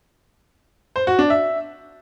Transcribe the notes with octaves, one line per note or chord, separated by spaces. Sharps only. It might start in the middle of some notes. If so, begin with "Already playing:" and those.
C5
F#4
D4
E5